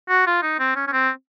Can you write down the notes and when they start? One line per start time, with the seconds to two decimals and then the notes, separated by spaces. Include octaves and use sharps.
0.09 F#4
0.27 F4
0.43 D#4
0.60 C4
0.76 C#4
0.87 C#4
0.93 C4